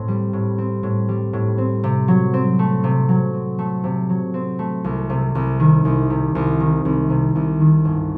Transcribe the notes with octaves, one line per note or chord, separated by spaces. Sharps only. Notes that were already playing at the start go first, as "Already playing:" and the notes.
Already playing: A2 C4
G3
A2
C4
A2
G3
A2
C4
C3
F#3
C4
A3
C3
F#3
C4
A3
C3
F#3
C4
A3
C2
C3
C2
D#3
C2
C3
C2
D#3
C2
C3
C2
D#3
G1